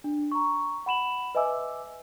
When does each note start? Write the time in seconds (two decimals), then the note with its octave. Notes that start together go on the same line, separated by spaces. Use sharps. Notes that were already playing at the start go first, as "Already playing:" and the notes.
0.04 D4
0.32 A#5 C#6
0.86 F#5 B5 E7 F#7
1.35 B4 D#5 E5 G#5 D6 E6